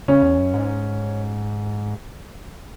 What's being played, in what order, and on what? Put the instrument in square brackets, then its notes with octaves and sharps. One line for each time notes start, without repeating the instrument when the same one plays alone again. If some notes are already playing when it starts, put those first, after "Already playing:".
[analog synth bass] C#3 [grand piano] C#4
[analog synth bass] E2
F#2
G#2